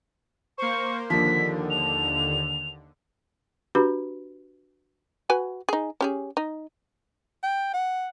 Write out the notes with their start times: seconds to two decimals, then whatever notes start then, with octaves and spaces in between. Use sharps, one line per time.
0.58 A#3 C5 C#6
1.10 D#2 D3 F3 A#3 B6
1.70 F7
3.75 D4 F#4 G4 B4 B5
5.30 F#4 B4 G#5
5.69 D#4 G#4
6.01 C#4 G4 G#4
6.37 D#4
7.43 G5
7.74 F#5